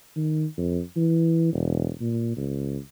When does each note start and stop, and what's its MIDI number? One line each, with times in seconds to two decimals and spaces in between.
0.16 0.45 51
0.58 0.81 41
0.96 1.52 52
1.53 1.90 28
2.01 2.33 46
2.37 2.78 37